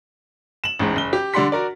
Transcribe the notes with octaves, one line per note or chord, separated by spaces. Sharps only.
E7 F#7
A1 E2 G#2
F#1 G7
G4
D3 G3 D4 F#5 C6 B6
F#4 A#4 D5